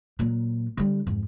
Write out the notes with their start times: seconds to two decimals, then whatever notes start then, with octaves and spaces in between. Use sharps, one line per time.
0.19 A#2 F#3
0.77 D3 G3
1.07 F2 G#2